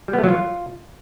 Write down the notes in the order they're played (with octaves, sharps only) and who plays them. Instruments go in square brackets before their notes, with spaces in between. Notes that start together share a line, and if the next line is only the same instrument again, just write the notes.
[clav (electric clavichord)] G3
B3
A3
F#3
F4